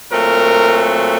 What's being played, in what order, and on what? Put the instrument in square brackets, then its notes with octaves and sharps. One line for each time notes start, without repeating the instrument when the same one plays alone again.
[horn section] A#2 F#3 A3 C4 A#4